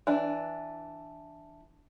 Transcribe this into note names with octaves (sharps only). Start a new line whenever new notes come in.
E3 D4